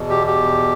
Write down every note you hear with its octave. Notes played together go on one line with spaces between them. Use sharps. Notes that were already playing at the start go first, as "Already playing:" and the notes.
Already playing: E2 B2
G4
G4